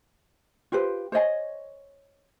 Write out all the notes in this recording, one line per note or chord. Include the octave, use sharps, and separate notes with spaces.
F4 G4 B4 C5
C5 C#5 D#5 G#5